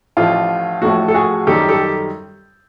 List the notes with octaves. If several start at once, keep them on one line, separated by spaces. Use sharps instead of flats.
A1 A2 F3 A3 F4
A1 A2 F3 A3 F#4
A4
F#4 G#4
F#2 D#3 G3 G4 A4
G4 A4